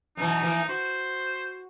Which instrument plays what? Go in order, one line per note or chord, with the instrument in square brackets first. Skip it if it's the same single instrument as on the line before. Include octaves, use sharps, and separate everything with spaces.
[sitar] F#2 B2 E3 [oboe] D#4
[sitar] E3 F3 A#3
[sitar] F#4 [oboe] C5